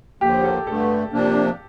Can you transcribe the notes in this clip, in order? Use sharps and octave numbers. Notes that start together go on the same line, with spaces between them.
D#2 D3 F3 A#3 G4
A4
G2 D3 A3 A4
C3 F3 A#3 D4